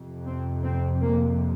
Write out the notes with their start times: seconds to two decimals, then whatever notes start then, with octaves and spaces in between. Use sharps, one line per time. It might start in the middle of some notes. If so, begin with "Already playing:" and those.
Already playing: F2 C3
0.27 C4
0.64 C4
1.01 A#3